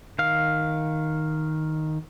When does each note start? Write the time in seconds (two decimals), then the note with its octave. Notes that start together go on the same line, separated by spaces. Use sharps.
0.19 D#3 F5